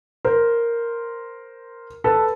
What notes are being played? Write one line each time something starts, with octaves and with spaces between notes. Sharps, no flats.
A#4 C5
A4 B4